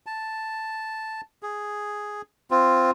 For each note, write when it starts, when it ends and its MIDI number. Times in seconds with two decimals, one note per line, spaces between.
0.06 1.21 81
1.43 2.22 68
2.51 2.91 60
2.51 2.91 65